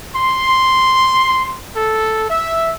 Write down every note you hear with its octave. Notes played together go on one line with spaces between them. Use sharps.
C6
A4
E5